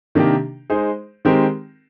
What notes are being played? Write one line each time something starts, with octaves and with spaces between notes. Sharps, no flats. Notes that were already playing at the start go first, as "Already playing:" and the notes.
C3 D#3 A#3 D4 G4
G#3 D#4 G#4 C5
D#3 G#3 C4 G4 A#4